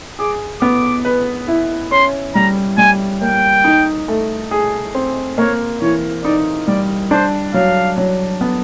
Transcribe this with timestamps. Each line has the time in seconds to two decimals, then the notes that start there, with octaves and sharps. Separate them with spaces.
0.19 G#4 D6
0.61 B3 D6
1.05 B4
1.48 E4
1.92 C#4 C6
2.35 G3 A#5
2.77 G3 G#5
3.22 A#3 G5
3.64 D#4
4.08 A3
4.51 G#4
4.95 C4
5.38 A#3 C#5
5.81 E3 C#5
6.24 D#4 D5
6.68 G3 D5
7.11 D4 C5
7.54 F#3 F5
7.98 F#3
8.41 B3